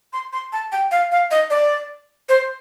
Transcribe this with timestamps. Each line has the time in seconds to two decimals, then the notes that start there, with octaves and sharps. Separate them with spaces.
0.13 C6
0.33 C6
0.53 A5
0.72 G5
0.91 F5
1.12 F5
1.31 D#5
1.50 D5
2.29 C5